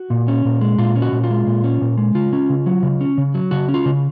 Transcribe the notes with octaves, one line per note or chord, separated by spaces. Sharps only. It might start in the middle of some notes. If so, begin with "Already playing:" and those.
Already playing: F#4
A#2
C#4
A#2
G#3
A#2 F4
C#4
F#4
A#2
F4
G#3
A#2
C#4
A#2
G#3
C#3 F4
C#4
C#3
F#3
C#3
C#4
C#3
F#3
C#3 F#4
C#4
F4
C#3